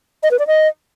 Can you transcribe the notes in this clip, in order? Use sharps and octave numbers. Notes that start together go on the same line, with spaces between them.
D#5
B4
D5
D#5